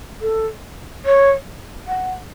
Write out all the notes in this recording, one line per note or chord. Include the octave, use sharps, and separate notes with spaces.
A4
C#5
F#5